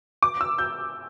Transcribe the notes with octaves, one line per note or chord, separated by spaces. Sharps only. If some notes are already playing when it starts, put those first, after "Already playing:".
D6
E6
G6